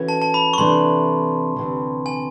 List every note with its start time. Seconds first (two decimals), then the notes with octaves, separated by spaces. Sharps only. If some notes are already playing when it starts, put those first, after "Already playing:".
Already playing: E3 A3 C#4 F#4
0.09 A5
0.22 A5
0.34 B5
0.53 C#6
0.58 C3 E3 A3 D4 C6
1.56 D2 C3 E3
2.06 G#5